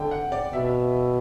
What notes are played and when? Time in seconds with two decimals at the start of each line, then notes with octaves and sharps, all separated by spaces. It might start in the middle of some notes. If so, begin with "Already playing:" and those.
Already playing: D3 G5
0.11 F#5
0.32 D5
0.53 B2 E5
0.65 E5